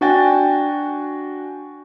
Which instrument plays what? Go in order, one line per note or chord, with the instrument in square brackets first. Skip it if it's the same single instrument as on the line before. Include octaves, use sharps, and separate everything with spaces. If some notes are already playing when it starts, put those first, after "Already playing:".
[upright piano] D4 F#4 G5 G#5 A6